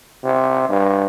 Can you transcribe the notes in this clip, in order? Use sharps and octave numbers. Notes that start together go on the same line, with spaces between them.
C3
G2